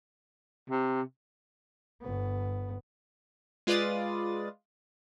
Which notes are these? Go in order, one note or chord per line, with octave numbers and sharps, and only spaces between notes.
C3
G1 B3
G#3 F4 B4 D5 D#6 A6